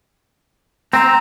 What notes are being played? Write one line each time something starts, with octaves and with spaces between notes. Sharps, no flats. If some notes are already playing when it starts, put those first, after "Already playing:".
C4 A#5